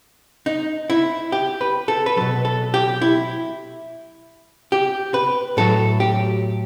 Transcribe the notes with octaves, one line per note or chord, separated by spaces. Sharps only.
D#4
E4
G4
B4
A4
B4
B2 F#3 A4
A4
G4
E4
G4
B4
A2 F#3 A4
G4